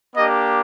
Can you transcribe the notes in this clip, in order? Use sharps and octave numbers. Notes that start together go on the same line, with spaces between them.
A#3 D4 G4 D#5